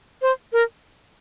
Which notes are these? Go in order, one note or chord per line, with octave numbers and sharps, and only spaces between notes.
C5
A#4